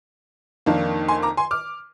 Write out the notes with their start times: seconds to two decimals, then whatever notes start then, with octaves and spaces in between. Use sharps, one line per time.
0.66 F2 D#3 A#3 D4
1.08 G#5 C6
1.23 A#5 D6
1.37 G#5 C6
1.51 D6 F6